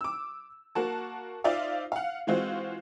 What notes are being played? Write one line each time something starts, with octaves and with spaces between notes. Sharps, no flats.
D6 E6
A#3 F#4 A5
D#4 F4 C5 D5 E5 F5
F5 F#5
E3 G#3 C4 F4 F#4 C5